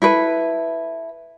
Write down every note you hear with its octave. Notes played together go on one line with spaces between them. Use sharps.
E4 A4 B4